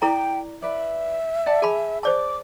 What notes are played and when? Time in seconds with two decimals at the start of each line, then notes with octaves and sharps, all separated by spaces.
0.02 E4 A4 D5 G5 A#5
0.62 B4 D5 E5
1.46 D5 F#5 A5
1.62 G#4 G#5 A5 B5
2.03 C5 D5 A5 D6